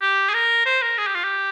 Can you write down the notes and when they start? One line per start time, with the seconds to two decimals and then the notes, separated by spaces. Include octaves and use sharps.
0.02 G4
0.29 G#4
0.34 A#4
0.66 C5
0.82 A#4
0.98 G#4
1.07 G4
1.15 F4
1.24 G4